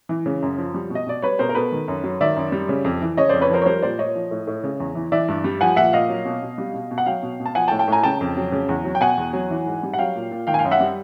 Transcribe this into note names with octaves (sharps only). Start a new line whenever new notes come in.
E3
C#3
F#2
F3
G3
B2
D#5
B2 D5
G3 B4 C#5
B2 A#4 C5
A#4
B2 A4 B4
D#3
F#2
F#3
D#3 D5 E5
F#2
G3
C#3
F2
E3
C#3 C#5 D#5
F2 C5 D5
B4 C#5
F3 A#4 C5
C#5
G3 A#4 C5
A#2 C5 D5
A#2 C#5 D#5
F3
A2
A2
C#3
E2
E3
E3 D5 E5
G2
G3
F3 F#5 G#5
A#2 E5 F#5
A#2 D#5 F5
F#3
B2
B2
G3
B2
B2
F#5
F#3 F5 G5
B2
B2
A5
F3 F#5 G#5
G5 A5
A2
G5 A5
A2 G#5 A#5
C#3 G5 A5
F2
F#3
C#3
E2
F#3
G5
B2 F#5 G#5
E2
F#3
E3
G#2
G3
F#5
F#3 F5 G5
A#2
A#2
D#3 F5 G5
G#5
F5 G5
F#2
E5 F#5
G3